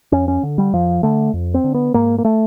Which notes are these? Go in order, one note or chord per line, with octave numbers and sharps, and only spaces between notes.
F2 C#4
C#4
D3
G3
F2 F3
D3 A3
F2
C4
D3
B3
G#2 A#3
A#3
A3